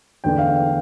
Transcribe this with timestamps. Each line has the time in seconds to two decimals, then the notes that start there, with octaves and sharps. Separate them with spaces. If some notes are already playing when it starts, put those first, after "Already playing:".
0.24 E2 D3 A3 D4 G5
0.39 F5
0.47 G5